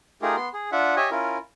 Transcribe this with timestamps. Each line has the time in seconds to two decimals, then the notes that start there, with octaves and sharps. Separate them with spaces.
0.22 A3 D#4 F4 G4 G#4 A#4
0.36 B3 C6
0.54 G#4
0.72 D4 F4 E5 F#5
0.96 G4 C#5 D#5 E5 G#5
1.11 C#4 E4 F4 A#4